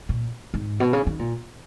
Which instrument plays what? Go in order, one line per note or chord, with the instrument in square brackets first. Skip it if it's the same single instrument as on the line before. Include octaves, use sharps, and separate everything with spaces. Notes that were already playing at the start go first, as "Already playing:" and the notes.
[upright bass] A#2
G#2
B2
C#3
D#3
A#2